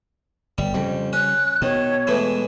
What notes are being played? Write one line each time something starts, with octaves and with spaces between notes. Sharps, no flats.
G1 G3
F2 C#3 G3
C#4 F#6
B2 D#3 C#5
A2 E3 G#3